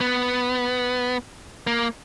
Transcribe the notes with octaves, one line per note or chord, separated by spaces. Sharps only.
B3
A#3